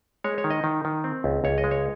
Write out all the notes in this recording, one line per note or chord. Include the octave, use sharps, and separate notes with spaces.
G#3 C#5
C#5
D#3
D#5
D#3
D#3
C4
C#2
C#2 C#5
D#5
G#3
C#5